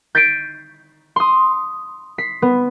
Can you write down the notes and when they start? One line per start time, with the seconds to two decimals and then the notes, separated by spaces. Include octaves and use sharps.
0.15 G6 A6 B6 C7 D7 D#7
1.16 C6 D#6
2.18 B6 C7
2.42 B3